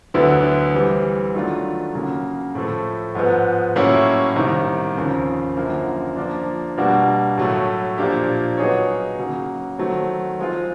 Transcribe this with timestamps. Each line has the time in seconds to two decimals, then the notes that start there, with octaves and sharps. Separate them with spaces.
0.14 D2 D3 F#3 B3 E4
0.74 E3 G3 C4
1.34 D#3 F#3 A3 D4 F4
1.95 C#3 F#3 A#3
2.55 A2 F3 A3
3.15 G#2 F3 G#3 B3
3.76 A2 F#3 A#3 C#4 E4
4.36 C2 C3 D#3
4.96 D#2 C#3 F3
5.57 F#2 D3 F3 A#3
6.16 F3 A#3 D4
6.77 B2 G3 A#3 D4 F#4
7.37 A2 F#3 A3
7.98 A#2 F3 A#3 D4 G4
8.58 F#3 B3 D#4 G#4 C#5
9.18 C#3 F#3 A#3
9.79 D#3 F#3 A3 C4
10.39 F3 G#3 C4 F4